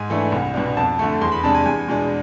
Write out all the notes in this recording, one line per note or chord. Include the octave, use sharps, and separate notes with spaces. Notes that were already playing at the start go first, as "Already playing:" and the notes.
Already playing: G#2 G#5
E3 A3 D4
C2
B2 B3 D4
F2 A5
D3 A3
E2 C6
B5
C3 G#3 D4 A5
G#5
E2 G#5
B2 G#3 D4